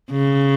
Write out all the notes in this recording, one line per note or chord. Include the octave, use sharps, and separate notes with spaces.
C#3